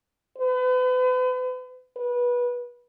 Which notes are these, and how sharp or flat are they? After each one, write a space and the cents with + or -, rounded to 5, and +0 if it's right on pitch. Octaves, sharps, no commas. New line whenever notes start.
B4 +40
B4 -20